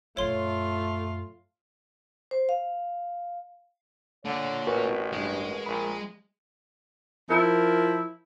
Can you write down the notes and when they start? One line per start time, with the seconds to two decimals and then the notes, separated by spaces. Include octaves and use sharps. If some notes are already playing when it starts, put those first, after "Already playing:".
0.17 F#2 A#2 A3 F4 C#5 C6
2.31 C5
2.49 F5
4.25 A#2 D3 C#5
4.67 A1 F#4 A#4 B4
5.12 G2 G#3
5.66 A#1 A#4 B5
7.30 F3 E4 A#4